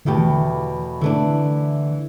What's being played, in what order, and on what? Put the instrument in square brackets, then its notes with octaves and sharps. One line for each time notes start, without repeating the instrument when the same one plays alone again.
[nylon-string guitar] E2 B2 A3 G4 [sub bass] D3
[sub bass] E3
D3
[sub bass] D3 [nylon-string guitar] E3 A3 D4